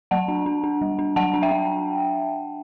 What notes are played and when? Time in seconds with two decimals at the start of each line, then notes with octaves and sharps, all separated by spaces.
0.11 F#3 F#5 A5
0.28 D4
0.46 D4
0.64 D4
0.81 G3
0.99 D4
1.16 F#3 F#5 A5
1.34 D4
1.42 E5 G5
1.51 D4